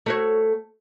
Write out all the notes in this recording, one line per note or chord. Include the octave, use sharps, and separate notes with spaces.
A3 F#4 C#5